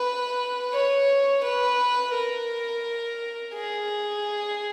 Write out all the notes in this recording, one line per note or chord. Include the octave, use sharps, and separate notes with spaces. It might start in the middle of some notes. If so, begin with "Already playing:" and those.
Already playing: B4
C#5
B4
A#4
G#4